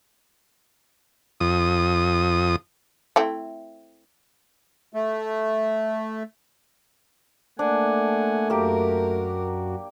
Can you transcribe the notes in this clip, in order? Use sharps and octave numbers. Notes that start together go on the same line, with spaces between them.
F2 D#6
A3 C4 E4
A3
A3 A#3 D4 F#5 G#5
F#2 A#3 F#4 G4 A#4